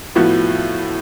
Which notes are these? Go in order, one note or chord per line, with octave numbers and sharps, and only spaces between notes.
A2 F3 B3 F#4